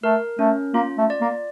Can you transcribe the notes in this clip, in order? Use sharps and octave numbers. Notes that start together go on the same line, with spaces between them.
A3 A#4
A3 C#4
A#3 F4
A3
D5
A#3